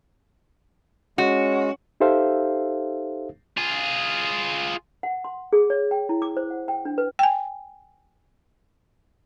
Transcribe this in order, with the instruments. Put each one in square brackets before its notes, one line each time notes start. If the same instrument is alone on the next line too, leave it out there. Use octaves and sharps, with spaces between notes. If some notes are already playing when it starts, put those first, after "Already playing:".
[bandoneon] G#3 [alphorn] C#4 [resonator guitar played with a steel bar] F#4
[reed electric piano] D#4 G4 A4 C5 E5 F5
[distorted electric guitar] F4 G#4
[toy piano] F#5
C6
G#4
C#5
G5
E4
D6
C5
F#5
G5
D4
B4
[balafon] G5 G#5